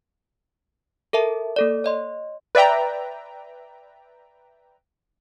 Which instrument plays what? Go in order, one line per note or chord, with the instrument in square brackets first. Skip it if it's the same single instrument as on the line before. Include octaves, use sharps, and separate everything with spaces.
[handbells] A4 A#4 E5 A5
A#3 A4 D5
C#5 D#5 C6
[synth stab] B4 D5 E5 G5 A#5